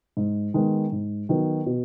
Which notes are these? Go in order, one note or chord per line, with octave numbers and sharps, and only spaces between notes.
G#2
D#3 G#3 B3
G#2
D#3 F#3 B3
B2